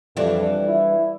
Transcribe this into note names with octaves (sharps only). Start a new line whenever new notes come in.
F2 E3 G3 D4
E4